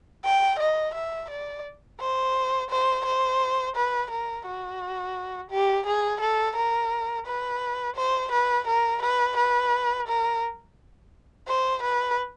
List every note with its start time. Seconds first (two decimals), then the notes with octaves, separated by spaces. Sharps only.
0.25 G5
0.59 D#5
0.94 E5
1.30 D5
2.00 C5
2.70 C5
3.06 C5
3.76 B4
4.11 A#4
4.46 F#4
5.51 G4
5.86 G#4
6.21 A4
6.56 A#4
7.26 B4
7.96 C5
8.32 B4
8.67 A#4
9.03 B4
9.37 B4
10.08 A#4
11.47 C5
11.83 B4